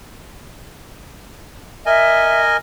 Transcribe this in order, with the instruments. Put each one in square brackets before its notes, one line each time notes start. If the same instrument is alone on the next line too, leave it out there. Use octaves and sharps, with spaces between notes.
[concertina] A#4 D#5 G#5 [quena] E5